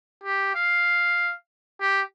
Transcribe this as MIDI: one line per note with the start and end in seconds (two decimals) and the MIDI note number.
0.24 0.54 67
0.55 1.33 77
1.81 2.01 67